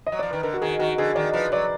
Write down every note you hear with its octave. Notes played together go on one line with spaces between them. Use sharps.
D#5
F#3
F3 D5
D#3 B4
D3 A#4
F#4
D#3 G#4
D#3 F#4
D3 G#4
D#3 D5
F3 B4
F#3 D5